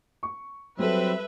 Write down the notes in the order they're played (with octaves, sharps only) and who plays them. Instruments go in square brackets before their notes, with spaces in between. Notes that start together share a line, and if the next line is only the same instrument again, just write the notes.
[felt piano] C#6
[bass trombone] F#3 [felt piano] G3 A4 [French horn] C4 [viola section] B4 E5